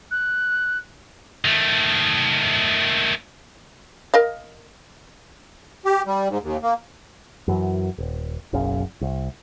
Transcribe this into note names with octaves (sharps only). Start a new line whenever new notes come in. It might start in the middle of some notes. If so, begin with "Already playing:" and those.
F#6
D#3 A3
A#4 D#5 F5
G4
G3
G#2
D#2
A#3
F#2 E3 F#3
D#1
F#1 B1 F#2 C#3
C2